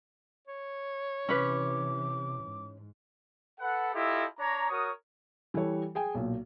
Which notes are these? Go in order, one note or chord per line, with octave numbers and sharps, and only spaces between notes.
C#5
C3 E3 C#4 B4 D6
G#2
A4 B4 F#5
E4 F4 G4 A4 D#5
D4 C#5 A#5
F#4 A#4 C#5 D#6
E3 G3 G4 A4 C#5
G#4 G5 G#5
B1 A#2